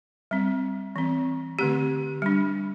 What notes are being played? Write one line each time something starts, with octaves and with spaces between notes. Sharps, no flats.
G3 C4
E3 C4
D3 A3 C4 G4
G3 D4